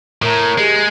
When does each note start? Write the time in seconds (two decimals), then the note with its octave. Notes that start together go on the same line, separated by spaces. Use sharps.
0.22 A2 A#4 A#5
0.58 G#3 G4 G#4